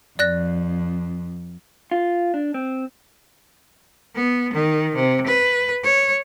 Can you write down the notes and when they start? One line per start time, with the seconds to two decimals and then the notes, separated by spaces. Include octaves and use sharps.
0.19 F2 D5 F#6 A#6
1.91 F4
2.34 D4
2.54 C4
4.15 B3
4.53 D#3
4.95 C3
5.27 B4
5.84 C#5